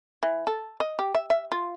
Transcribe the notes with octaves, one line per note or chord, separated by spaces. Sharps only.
E3
A4
D#5
G4
E5
E5
F4